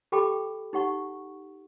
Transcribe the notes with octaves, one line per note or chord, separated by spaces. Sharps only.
G4 A4 G5 B5 D6
D#4 G4 F#5 C#6